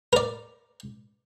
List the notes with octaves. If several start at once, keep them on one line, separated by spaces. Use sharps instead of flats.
A#4 D5